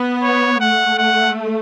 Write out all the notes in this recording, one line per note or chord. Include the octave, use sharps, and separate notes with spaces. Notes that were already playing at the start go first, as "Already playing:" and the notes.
Already playing: B3
C#5
A3 F#5
F#5